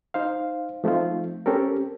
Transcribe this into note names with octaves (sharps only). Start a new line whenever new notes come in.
D#4 C5 F5
F3 A3 C4 D#4 F4
C4 C#4 G4 A4 A#4